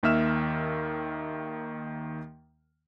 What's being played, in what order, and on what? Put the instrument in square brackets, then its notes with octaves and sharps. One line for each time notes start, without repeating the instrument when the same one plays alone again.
[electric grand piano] D#2 D#3 A#3 E5 F6 E7